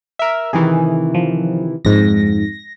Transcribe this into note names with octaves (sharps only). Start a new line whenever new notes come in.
A#4 E5
C3 D#3 E3 G#4
F3
F2 G#2 A#6